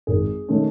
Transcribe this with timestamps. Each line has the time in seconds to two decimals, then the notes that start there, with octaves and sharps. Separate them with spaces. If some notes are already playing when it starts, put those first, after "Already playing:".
0.07 G#1 G#4
0.48 D#3 A3 C#4